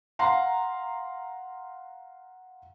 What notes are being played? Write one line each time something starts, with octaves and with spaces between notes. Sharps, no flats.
F5 F#5 A#5 C6